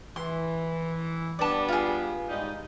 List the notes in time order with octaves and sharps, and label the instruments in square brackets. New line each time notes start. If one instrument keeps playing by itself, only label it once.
[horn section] E3 [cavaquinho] C6
[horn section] G3 B3 D4 [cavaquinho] D5 A5
[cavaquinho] F4 G#4
[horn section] G#2 G3 D#4